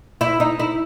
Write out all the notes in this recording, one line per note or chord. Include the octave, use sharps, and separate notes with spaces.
E4
D#4
E4